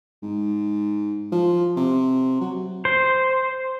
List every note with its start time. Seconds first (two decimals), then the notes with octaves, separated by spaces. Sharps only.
0.22 G#2
1.32 F3
1.77 C3
2.41 F#3
2.85 C5